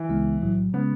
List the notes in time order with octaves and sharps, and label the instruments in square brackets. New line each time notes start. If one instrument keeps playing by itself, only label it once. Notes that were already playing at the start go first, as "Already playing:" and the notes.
Already playing: [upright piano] E3
[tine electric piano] C#2 C#3 G#3 B3 E4
B1 A2 F#3
[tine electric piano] C#3 G#3 C#4 [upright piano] B3